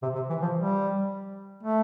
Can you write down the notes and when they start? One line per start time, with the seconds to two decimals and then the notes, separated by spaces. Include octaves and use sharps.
0.02 C3
0.15 C3
0.30 E3
0.42 F3
0.56 G3
1.63 A3